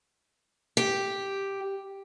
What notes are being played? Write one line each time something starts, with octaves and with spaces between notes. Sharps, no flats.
G4